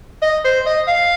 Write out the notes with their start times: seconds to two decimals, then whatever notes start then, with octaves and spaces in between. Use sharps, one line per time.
0.22 D#5
0.44 C5
0.66 D#5
0.88 F5